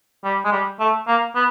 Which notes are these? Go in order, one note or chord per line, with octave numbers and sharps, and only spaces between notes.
G3
G#3
G3
A3
A#3
B3